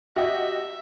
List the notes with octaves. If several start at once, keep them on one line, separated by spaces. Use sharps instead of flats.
F#4 G4 D#5 E5